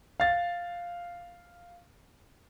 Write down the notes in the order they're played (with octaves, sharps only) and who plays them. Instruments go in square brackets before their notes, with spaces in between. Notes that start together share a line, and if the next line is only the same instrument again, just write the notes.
[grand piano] F5 A6